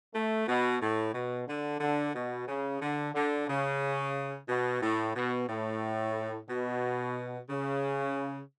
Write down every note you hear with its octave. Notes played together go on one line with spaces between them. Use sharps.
A3
B2
A2
B2
D3
D3
B2
C#3
D3
D3
C#3
B2
A2
B2
A2
B2
C#3